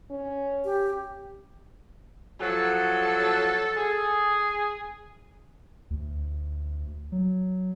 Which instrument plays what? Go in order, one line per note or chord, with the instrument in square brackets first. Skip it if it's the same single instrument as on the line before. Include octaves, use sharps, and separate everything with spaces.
[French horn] C#4
[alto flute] G4
[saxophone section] F3 F#3 [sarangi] A4
[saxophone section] G#4
[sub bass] D2
F#3